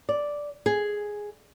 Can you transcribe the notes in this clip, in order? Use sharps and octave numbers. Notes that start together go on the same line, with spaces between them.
D5
G#4